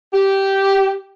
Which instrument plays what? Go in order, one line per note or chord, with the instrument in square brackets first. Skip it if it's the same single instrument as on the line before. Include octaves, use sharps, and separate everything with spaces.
[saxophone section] G4